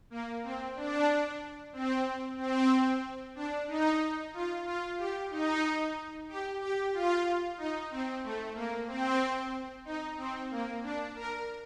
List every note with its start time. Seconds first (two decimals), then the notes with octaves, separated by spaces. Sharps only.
0.10 A#3
0.43 C4
0.75 D4
1.73 C4
2.38 C4
3.35 D4
3.68 D#4
4.34 F4
4.66 F4
4.97 G4
5.30 D#4
6.28 G4
6.61 G4
6.93 F4
7.57 D#4
7.91 C4
8.23 A3
8.55 A#3
8.87 C4
9.85 D#4
10.18 C4
10.51 A#3
10.83 D4
11.16 A#4